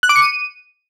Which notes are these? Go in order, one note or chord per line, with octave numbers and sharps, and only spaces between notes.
F#6
D6
C#7
D#7